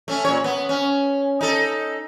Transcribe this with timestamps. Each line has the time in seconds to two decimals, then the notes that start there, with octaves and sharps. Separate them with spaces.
0.08 A3 C#4
0.25 A#2 C#5
0.44 B3
0.69 C#4
1.41 D#4 A4